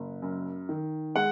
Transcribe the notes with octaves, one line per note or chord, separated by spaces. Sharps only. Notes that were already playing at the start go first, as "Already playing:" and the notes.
Already playing: F#1
F#2
D#3
G#3 F#5